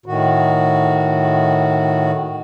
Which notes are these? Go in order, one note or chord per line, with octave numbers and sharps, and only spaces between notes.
A2 D#3 F#4